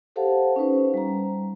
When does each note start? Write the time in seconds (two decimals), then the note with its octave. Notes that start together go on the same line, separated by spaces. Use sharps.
0.16 G4 A4 C5 F5 F#5 A5
0.56 C#4 D#4 B4 C5
0.94 G3 A#5